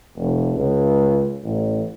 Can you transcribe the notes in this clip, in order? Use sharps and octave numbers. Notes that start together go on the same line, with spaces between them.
F1
C#2
A1